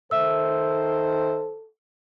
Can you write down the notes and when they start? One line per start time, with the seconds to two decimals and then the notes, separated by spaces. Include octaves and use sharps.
0.11 D#3 A4 C5 E5 E6